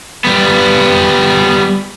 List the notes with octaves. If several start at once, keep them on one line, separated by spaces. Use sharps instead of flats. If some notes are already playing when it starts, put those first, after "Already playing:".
G3 B3